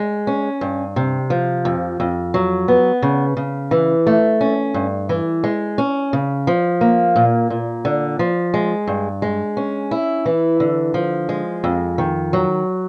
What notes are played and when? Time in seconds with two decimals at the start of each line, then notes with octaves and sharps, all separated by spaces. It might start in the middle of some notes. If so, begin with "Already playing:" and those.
Already playing: G#3
0.27 C#4
0.61 G2
0.96 C3
1.30 F3
1.65 F2
2.00 F2
2.34 F#3
2.68 B3
3.02 C#3
3.37 C#3
3.71 E3
4.07 A3
4.41 C#4
4.74 G2
5.09 E3
5.44 G#3
5.78 C#4
6.13 C#3
6.47 F3
6.81 A#3
7.16 A#2
7.50 A#2
7.85 D3
8.19 F3
8.54 G#3
8.87 G2
9.22 G#3
9.57 C#4
9.91 E4
10.26 E3
10.60 D3
10.94 F3
11.29 G#3
11.64 F2
11.98 D#3
12.33 F#3